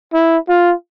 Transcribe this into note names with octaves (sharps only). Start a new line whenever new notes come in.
E4
F4